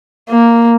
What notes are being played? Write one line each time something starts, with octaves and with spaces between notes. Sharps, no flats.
A#3